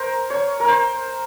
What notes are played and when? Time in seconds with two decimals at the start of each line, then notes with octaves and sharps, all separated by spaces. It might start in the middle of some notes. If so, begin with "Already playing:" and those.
Already playing: A#4 C5
0.30 C#5
0.60 A#4
0.68 C5